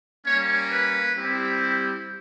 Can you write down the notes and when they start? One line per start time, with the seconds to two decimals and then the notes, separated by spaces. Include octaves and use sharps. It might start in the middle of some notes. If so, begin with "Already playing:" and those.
0.26 G3 A#3 C#4 C#5
0.72 B4
1.18 G3 C4 E4 G4